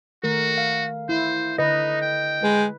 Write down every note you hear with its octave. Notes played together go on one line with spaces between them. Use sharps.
D#3 A3 F#4 A#4
F5
E4 C5
D3 D#4 B4 D#5
G5
G#3 B4